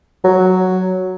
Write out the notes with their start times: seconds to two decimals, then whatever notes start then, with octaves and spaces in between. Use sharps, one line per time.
0.24 F#3